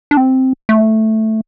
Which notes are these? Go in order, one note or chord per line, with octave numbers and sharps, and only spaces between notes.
D4
C4
A3